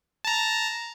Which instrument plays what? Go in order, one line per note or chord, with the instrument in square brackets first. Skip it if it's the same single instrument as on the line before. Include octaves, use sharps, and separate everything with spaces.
[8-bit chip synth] A5 A#5